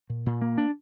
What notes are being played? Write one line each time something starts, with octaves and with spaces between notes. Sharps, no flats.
A#2
A#2
A#3
D4